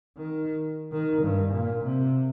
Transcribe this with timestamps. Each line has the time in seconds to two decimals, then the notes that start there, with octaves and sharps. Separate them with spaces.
0.17 D#3
0.92 D#3
1.23 G2
1.53 A#2
1.83 C3